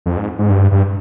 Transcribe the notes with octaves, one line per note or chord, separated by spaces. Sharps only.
F2
G#2
G#2
G2
G2